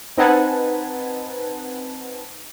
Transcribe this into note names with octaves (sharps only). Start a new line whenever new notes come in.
C4 D#4 B4 F#5 G#5 A5